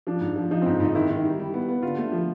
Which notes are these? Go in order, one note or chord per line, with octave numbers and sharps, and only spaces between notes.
F3 D4
G#2
F3
F3 D#4
C4
G#2
G#2 D#4
D#3 E4
D#3
G3
G3
B3
B3
D3 F4
A3
F3